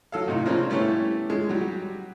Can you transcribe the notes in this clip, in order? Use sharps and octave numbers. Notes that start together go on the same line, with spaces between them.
F#3 A4 F5
A2 C3 D#4
C#3 F3 A#3 C4 D4 F4
G3 A3 B3 C#4 E4 G4
G#3 C#4
F#3 G3